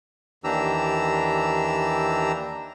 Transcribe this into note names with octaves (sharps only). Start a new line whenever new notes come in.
D#2 E3 D4 G4 A#5 E6